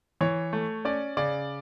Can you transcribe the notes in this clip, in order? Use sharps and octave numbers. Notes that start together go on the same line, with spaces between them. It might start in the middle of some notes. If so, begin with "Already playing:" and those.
E3 C#5
A3
C#4 D5
C#3 D5